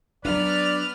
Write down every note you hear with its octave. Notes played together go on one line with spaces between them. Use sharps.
F#3 B3 D4 B4 D5 F6